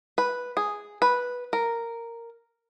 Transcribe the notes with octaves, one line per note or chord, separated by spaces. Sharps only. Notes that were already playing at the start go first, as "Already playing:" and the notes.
B4
G#4
B4
A#4